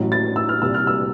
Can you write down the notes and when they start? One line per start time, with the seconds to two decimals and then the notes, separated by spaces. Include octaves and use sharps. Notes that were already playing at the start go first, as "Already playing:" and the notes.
Already playing: A1 A2 F#3
0.12 A6
0.36 E6
0.49 F6
0.62 C2 A#2 G3 E6
0.74 F6
0.87 E6